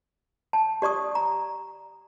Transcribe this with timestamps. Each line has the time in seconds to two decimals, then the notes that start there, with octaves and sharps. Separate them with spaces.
0.53 A5
0.82 G4 D5 C#6 D#6
1.15 A#5